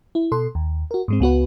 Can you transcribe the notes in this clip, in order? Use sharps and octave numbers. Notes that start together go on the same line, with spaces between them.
E4
B2 A4 C6
D#2
F#4 A#4
G#2 G#3 C4
C#2 B3 F#4 B4